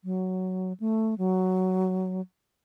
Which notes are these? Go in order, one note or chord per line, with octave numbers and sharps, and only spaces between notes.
F#3
A3
F#3